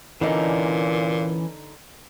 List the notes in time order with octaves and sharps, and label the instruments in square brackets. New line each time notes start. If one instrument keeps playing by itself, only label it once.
[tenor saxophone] A#2 [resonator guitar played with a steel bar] D3 D#4 [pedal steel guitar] E3 C#4